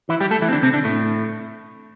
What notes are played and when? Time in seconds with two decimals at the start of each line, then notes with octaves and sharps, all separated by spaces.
0.09 E3 E4
0.20 G3 G4
0.31 A3 A4
0.42 E3 E4
0.49 C4
0.52 D3 D4
0.62 C3 C4
0.73 D3 D4
0.84 A2 A3